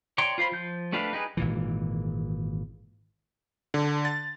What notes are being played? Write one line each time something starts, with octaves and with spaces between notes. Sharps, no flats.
C#5 D5 G5 A#5 C6
F4 C5 F5 B5
F3 G6
A3 D4 G4 B4 F5
D#4 G4 G#4 B4
G#1 A#2 E3
D3
A6